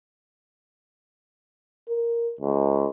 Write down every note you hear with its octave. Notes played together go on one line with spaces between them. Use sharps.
A#4
C#2